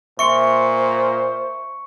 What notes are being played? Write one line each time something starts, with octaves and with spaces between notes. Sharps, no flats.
A#2 C5 E5 C6 C#6 C#7